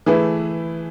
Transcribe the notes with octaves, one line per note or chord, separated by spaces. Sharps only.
E3 A3 E4 G#4 B4